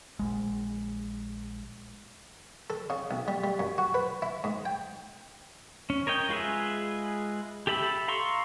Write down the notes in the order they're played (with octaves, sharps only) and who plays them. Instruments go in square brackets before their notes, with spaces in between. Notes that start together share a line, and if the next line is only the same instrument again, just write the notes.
[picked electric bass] A#1 G#3
[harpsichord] A4
C#3
B1
G3
G3
F#2
F#4
B4
E4
G#2
G5
[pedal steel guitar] C#4
A#4 C#5 D#5 G5
G#3 F4 G#4 B4 E5
G4 A4 E5 B5 E6
F5 A#5 C6 C#6 E6